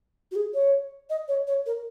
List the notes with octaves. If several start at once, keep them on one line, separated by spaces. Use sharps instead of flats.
F#4
G#4
C#5
D#5
C#5
C#5
A#4